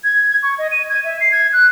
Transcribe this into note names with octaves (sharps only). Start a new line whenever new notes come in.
G#6
C#6
D#5
D#7
G#6
E5
C7
G#6
F#6